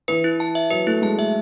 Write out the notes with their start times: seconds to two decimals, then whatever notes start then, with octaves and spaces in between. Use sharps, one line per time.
0.08 E3 B4
0.24 E4
0.40 A5
0.55 E5
0.70 F#3 B4
0.87 A3 E4
1.02 G#3 A5
1.18 A3 E5